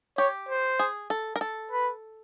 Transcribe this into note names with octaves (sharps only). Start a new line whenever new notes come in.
G4 C#5
C5
G#4
A4
A#4
A4
B4